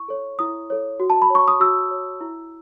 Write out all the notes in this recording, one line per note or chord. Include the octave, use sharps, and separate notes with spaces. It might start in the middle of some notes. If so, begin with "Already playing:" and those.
Already playing: E4 C#6
A4 C#5
E4 D#6
A4 C#5
F#4
A5
B5
C#5 C#6
D#6
F#4 E6
C#5
E4